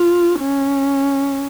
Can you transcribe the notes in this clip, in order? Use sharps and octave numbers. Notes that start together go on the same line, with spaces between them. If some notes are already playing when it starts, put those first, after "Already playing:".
Already playing: F4
C#4